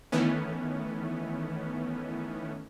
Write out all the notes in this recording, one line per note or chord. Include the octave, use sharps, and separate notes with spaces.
D#3 E3 A3 B3 C#4